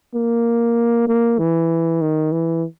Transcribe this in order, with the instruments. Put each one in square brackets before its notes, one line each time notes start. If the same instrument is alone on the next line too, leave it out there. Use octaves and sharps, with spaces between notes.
[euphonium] A#3
A#3
E3
D#3
E3